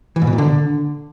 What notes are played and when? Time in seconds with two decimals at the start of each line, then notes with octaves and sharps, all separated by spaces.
0.16 E3
0.22 G#2
0.27 B2
0.33 A#2
0.38 D3